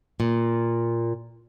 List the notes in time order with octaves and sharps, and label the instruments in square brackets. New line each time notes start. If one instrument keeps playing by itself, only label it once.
[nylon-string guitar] A#2